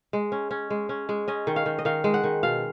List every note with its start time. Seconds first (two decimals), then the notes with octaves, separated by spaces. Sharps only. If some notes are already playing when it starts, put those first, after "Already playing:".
0.13 G#3
0.32 C#4
0.51 C#4
0.70 G#3
0.89 C#4
1.09 G#3
1.28 C#4 D#5
1.47 D#3
1.56 F5
1.66 D#3
1.79 D#5
1.85 D#3 F5
2.04 G#3
2.14 F#5
2.24 D#3
2.43 B2 F5